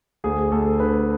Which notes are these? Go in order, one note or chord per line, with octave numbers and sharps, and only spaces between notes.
D2 G#4
D2 A4
D3 B4